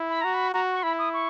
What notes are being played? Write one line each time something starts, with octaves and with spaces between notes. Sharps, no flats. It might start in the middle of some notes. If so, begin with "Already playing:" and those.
Already playing: E4
B5
F#4 A#5
B5
F#4 A#5
C#6
E4 B5
D#6
C#6